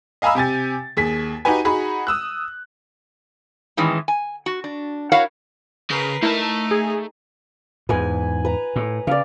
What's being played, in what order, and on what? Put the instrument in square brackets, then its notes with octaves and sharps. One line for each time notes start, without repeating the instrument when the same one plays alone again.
[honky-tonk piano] D#5 F5 G#5 A#5 B5 E6
C3 G4 G#5 A6
D#2 G#4 B6
D#4 F#4 G4 B4 G#5
D#4 F#4 G#4 F#5 B5
D#6 E6 F#6
[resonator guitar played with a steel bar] A2 D#3 E3 G#3 C#4
G#5
F#4
D4
E4 F#4 A#4 C#5 F5 F#5
[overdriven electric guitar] C#3 [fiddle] A#4 B4 [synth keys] C7
[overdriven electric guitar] A3 A5 [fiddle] D#4 [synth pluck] E4 A#4
[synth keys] G#4
[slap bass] E2 G#2 [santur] B4 G#5
[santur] B4 A#5
[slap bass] A2
[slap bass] C#3 [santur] D5 F5